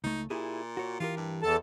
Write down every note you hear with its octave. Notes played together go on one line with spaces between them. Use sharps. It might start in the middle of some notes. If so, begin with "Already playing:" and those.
C#2 A3 D#4
A#2 E4 G4 G#4
F#4 C#5
E3 F4 G4 A#4
G2
E2 A4 A5